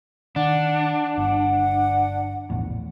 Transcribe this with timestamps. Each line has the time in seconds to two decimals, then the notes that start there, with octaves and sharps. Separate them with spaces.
0.36 D#3 D4 F#5
1.17 G1 F#5
2.50 A#1 E2 A2